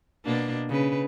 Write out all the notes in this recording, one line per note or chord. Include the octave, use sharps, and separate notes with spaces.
B2 A#3 D4
C#3 B4